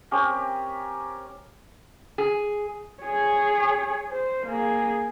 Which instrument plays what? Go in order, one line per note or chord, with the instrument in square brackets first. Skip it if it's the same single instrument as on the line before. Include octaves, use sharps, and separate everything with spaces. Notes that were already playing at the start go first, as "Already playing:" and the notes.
[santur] C4 C#4 G4 A#4
[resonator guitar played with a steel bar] G#4
[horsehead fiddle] G#4 C#5
C5
A#3 G#4